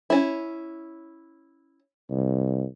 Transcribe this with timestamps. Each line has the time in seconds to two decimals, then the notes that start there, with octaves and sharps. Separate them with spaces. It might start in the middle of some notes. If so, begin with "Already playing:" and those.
0.10 C#4 E4
2.10 C2